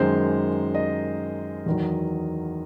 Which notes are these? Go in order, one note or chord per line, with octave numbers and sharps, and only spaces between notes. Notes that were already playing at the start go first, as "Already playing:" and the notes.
Already playing: F#2 D#3 G#3 C5
D#5
E2 D#3 F#3